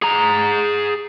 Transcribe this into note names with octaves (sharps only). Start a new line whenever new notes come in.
G#4 A#5